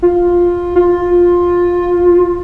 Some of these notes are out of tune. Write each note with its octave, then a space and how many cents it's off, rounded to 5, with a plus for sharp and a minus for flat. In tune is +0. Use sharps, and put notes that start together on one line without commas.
F4 +10
F4 +15